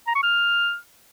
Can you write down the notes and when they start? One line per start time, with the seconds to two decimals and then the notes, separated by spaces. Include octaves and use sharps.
0.07 A#5
0.15 C#6
0.23 F6